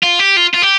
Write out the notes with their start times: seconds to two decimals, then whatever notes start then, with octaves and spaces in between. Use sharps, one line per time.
0.03 F4
0.20 G4
0.37 F4
0.54 F4
0.62 G4